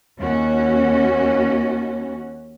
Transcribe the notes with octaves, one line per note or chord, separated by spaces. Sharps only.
D#2 C#4 F#4